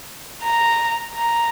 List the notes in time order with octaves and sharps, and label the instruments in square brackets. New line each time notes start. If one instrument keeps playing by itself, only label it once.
[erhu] A#5
A#5